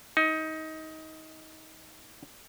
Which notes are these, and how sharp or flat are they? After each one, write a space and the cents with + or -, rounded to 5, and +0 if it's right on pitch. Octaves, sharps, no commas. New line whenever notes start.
D#4 +20